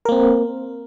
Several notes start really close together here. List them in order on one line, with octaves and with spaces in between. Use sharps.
A#4 A#3 C4